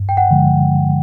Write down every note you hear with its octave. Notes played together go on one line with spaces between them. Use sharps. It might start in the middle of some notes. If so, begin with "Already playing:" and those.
Already playing: G2
G5
F#5
D3 F3 G#3